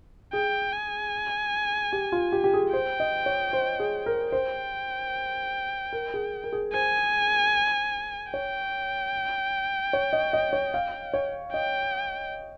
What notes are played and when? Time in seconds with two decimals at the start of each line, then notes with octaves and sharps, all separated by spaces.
0.33 G#4 G5
0.73 G#5
1.93 G4
2.12 F4
2.32 G4
2.44 G4
2.54 G#4
2.73 C5 G5
3.00 D#5
3.26 C#5
3.53 C5
3.80 G#4
4.06 A#4
4.32 C5 G5
5.93 A#4
6.14 G#4
6.44 A#4
6.53 G#4
6.73 C5 G#5
8.33 C#5 G5
9.93 C#5
10.13 D#5
10.33 D#5
10.53 C#5
10.74 F5
11.14 C#5
11.53 D#5 G5